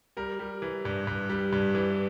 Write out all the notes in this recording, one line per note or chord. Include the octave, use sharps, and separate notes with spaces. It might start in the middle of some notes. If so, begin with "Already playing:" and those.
G3 A#4
G3
E3
G2
G2
G3
G2
E3